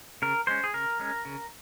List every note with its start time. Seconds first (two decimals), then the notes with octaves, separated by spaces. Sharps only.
0.22 C#3 A#4
0.47 G#3 C#4 C5
0.64 G#4
0.73 C#3 A#4
1.00 G#3 C#4
1.25 C#3